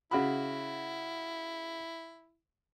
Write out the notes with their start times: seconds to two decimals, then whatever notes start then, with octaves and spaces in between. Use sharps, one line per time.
0.11 C#3 E4 F#4 B5